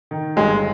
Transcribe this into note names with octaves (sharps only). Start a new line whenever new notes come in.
D#3
G1 G#3